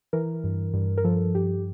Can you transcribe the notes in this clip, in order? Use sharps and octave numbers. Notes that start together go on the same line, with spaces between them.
E3 A#4
G2
G2
A#4
F3 A4
G2 G4